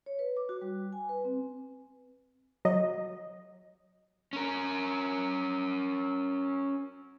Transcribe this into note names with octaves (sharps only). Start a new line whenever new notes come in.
C#5
B4
D6
F#4
G3
G#5
B4
C4
F#3 D#5
C#4 A#4